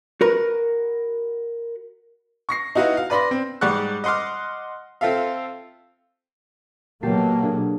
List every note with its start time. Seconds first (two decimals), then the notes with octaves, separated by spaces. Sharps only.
0.21 F#4 A#4 B4
2.49 C#6 A#6 C7
2.75 D#4 E4 F#4 B4 F5 F#5
2.97 F5
3.10 B4 D5 B5 C6 A#6
3.31 C4
3.61 G#2 G3 D5 F#5 C#6 F#6
4.04 D#5 F#5 C6 D6 F6
5.01 C4 F4 A4 E5 F5
7.03 B2 F#3 A#3 G4 A5 C7
7.43 D4 G#4